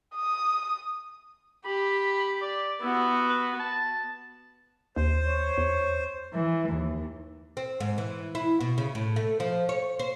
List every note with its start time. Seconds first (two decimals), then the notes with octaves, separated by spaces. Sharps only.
0.15 D#6
1.65 G4 B5
2.42 D5
2.82 B3 E4 F#4
3.29 B4
3.59 A5
4.96 D#2 C5
5.27 C#5
5.58 E2
6.33 E3
6.70 D#2
7.57 C4
7.80 G#2
7.98 E3
8.35 E4
8.61 B2
8.78 C#3
8.95 A2
9.16 A3
9.40 F3
9.69 C#5
9.99 C5